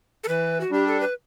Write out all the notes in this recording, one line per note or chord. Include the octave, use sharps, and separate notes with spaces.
A4
E3 B4
F#4
G3 D4 G4
A4
B4